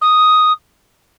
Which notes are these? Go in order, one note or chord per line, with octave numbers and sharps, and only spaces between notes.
D#6